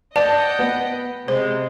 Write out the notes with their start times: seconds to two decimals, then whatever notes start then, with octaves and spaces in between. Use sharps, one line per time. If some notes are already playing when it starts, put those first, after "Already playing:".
0.16 D5 D#5 F#5 G5 A5
0.59 B3
1.28 C3 G#3 C5